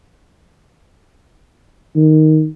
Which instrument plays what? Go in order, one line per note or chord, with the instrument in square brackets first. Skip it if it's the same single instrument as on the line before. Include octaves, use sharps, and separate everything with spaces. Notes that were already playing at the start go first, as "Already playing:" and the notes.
[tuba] D#3